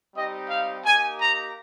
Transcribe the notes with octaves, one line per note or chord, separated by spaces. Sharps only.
G3 C4 D#4 G4 D#5
F5
A#3 D#4 G4 G#5
A#5